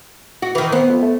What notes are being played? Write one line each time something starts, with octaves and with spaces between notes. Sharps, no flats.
F#4
D#3 E3
B3 C4
F2
A3